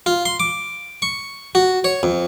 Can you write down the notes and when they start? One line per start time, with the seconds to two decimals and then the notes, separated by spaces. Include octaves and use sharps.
0.06 F4
0.25 C6
0.40 D6
1.02 C#6
1.55 F#4
1.84 C#5
2.03 F2